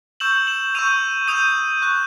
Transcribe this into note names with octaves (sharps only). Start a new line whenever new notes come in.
C#6 E6 G6 E7 F#7
E7 F#7
C#6 E6 G6 D#7 F7
D#6 G6 D#7 F7
C#6 F#6